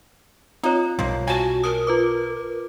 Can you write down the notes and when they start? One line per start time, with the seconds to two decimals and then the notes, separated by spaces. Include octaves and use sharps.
0.63 C4 D#4 F4 C#5
0.99 B1 B2 F3 G3 A#3
1.28 F#4 G#5 A5
1.64 A#4 D#6
1.87 F4 B4 D6